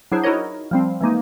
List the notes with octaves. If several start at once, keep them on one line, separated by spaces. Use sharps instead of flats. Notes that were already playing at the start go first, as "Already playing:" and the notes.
F#3 D4 E4 G#4 C5
D#4 E4 F#4 A#4 C#5 D#5
F3 G3 C4
E3 G#3 A#3 D#4